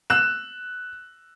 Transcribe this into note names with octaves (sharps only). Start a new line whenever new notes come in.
E6 F#6 E7